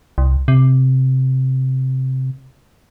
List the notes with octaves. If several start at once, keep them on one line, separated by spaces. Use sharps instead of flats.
C2
C3